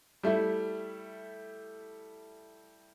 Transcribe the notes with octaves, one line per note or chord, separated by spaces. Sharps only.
G3 A3 E4